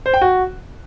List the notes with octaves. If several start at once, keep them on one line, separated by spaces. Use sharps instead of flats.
C5
G5
F#4